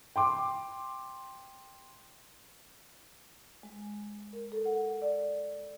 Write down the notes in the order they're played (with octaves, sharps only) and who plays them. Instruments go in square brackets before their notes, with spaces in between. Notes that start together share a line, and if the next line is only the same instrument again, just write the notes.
[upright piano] G5 C6 D6
[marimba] G#3
A#4
A4
F#5
D5